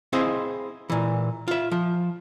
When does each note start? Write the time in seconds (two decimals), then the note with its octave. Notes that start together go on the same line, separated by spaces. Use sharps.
0.13 C4 E4 G#4 C5 D#5 F5
0.90 A#2 E3
1.48 F4 E5
1.71 F3